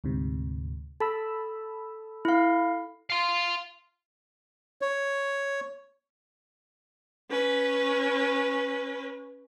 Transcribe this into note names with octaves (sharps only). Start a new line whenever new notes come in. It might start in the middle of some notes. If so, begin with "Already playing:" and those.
D2 G#2 C3
A4 A5 B5 E6
E4 F5
F5 C6
C#5
C#4 B4